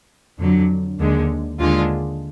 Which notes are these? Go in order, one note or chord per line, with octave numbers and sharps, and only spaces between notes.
F2 D3 F#3
D#2 D3 G#3
D#2 D3 G#3 D4 F4